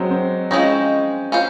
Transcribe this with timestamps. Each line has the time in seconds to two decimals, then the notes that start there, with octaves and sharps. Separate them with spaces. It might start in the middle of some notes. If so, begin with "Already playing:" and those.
Already playing: F#3 G#3 C4
0.11 C4
0.51 F3 G#3 C4 C#4 D#4
1.32 C#4 F4 C5